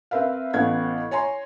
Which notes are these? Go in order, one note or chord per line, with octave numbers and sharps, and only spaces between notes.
C4 A#4 B4 E5 F5
A1 B3 A4 F5 G#6
C#5 G#5 A#5 C6